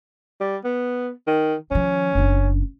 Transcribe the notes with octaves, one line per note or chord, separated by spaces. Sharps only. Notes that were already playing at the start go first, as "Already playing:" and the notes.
G3
B3
D#3
D#3 F3 C#4
F#1 D4